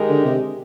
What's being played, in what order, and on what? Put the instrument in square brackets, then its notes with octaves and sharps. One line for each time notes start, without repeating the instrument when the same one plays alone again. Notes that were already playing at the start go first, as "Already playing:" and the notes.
Already playing: [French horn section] D#3 G#3 D#4 G4 A#4
[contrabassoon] D3
C3